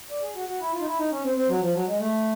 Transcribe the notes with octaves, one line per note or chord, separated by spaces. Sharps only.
D5
G#4
F#4
F#4
E4
F4
D#4
E4
D#4
C#4
C4
C4
F#3
F3
F#3
G#3
A3